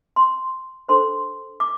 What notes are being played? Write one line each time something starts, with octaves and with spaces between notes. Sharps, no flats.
C6
D4 A4 C5 C6
D6